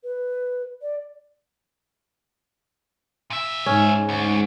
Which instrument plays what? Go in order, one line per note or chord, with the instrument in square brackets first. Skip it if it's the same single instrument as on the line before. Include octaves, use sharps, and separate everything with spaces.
[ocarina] B4
D5
[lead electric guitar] A#2 E5
[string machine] G#2 [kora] C#4
[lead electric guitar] D2